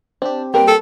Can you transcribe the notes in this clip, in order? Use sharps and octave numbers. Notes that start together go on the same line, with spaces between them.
C4 D4 G4
G3 A#3 C4 G4 A#4 B4 G5
A4